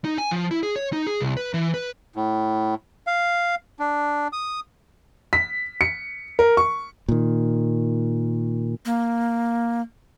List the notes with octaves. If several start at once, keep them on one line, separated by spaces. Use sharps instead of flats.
D#4
G#5
F3
E4
G#4
C#5
D#4
G#4
C2
B4
E3
B4
A2
F5
D4
D#6
B6
C#7
A#4
C#6
A#2 D#3
A#3